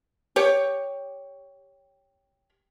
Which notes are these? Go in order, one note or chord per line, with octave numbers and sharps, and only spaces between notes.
G4 C#5